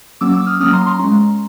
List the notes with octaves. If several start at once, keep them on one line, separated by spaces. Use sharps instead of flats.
F#3 A#3 C#4 D6 E6
D6 E6
D#6 F6
F#3 A#3 C#4 D#6 F6
A#5 C6
A#5 C6
G#3 C#4